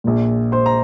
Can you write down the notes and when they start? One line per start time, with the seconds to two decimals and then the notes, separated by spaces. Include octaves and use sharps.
0.04 A#1 A#2
0.52 C5 C6
0.66 A#5